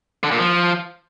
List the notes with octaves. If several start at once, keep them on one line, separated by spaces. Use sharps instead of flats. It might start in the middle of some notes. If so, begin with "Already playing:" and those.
D3
A#2
F3